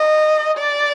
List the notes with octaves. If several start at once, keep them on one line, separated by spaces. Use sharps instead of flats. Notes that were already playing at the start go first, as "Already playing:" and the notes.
Already playing: D#5
D5